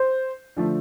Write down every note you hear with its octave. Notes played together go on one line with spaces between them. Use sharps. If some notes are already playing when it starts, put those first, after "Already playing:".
Already playing: C5
D3 F3 A3